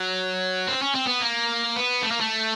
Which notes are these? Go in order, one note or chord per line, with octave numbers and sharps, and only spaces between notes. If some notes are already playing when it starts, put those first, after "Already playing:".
Already playing: F#3
C4
C#4
C4
B3
A#3
B3
A3
A#3
A3